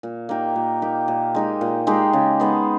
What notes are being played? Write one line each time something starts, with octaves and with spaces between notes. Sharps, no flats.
A#2
A#3 D#4 G4
A#2
A#3 D#4 G4
A#2
G#3 D#4 G4
A#2
G#3 D#4 G4
C#3
G#3 B3 D#4